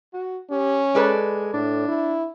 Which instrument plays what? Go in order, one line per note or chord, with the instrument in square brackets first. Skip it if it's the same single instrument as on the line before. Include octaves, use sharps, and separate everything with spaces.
[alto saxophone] F#4
[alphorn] C#4 [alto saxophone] G4
[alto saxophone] G#3 [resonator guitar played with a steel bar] A4 B4 D5
[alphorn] A2 [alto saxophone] D4
[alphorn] E4